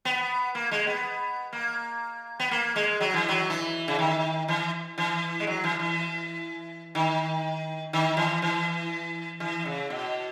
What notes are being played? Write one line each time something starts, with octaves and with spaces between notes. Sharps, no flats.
B3
A#3
G#3
B3
A#3
B3
A#3
G#3
F#3
E3
F#3
E3
C#3
D#3
E3
E3
G#3
F#3
E3
E3
D#3
D#3
E3
E3
E3
C#3
B2